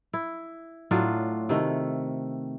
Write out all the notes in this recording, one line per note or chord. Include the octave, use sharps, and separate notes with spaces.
E4
A2 F#3 D4 F4
C3 D#3 A3